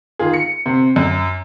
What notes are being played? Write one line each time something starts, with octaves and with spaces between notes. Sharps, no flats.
D#3 F4 G#4
C#7
C3
F#2